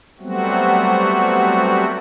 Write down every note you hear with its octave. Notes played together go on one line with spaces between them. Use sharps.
F#3 G3 A3 B3 C4 F#4